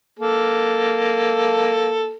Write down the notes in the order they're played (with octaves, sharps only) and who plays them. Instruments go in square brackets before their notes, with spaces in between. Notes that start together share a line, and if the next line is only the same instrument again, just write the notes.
[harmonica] A#3 A4